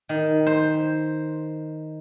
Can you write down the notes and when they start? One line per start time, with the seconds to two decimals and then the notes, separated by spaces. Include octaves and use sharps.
0.09 D#3
0.46 C5